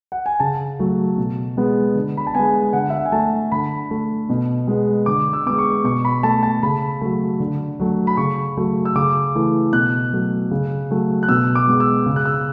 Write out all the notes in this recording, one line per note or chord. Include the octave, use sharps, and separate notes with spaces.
F#5
G#5
C#3 A5
F#3 A3
B2
G#3 B3
D3
B5
A5
G#3 B3 G#5
D3 F#5
E5
F#5
G#5
A3 A5
D3 B5
A3
B2
G#3 B3
D3 D6
E6
G#3 B3 D6
C#6
B2 C#6
B5
A3 A5
A5
C#3 B5
F#3 A3
D3
F#3 A3
B5
C#3 C#6
F#3 A3
E6
C#3 D6
E3 A3
B2 F#6
F#3 A3
C#3
F#3 A3
F#6
B2 E6
D6
G#3 B3
E6
C#3
F#6
E6